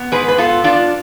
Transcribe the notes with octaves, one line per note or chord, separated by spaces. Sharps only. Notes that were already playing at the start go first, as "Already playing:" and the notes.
Already playing: B3
G#2 G#4 B4
B4
B3 F4 A4
B3 D4 F4